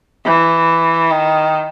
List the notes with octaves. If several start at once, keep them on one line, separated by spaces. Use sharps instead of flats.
E3
D#3